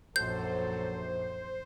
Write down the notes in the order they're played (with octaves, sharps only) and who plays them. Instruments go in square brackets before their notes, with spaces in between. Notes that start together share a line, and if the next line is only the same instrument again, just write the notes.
[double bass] A#1 F#2 [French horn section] F#3 A4 [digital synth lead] C5 [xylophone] G6